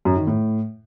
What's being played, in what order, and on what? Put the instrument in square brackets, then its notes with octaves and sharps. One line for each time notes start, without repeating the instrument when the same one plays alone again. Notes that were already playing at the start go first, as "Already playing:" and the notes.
[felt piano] F#2
D#3
A2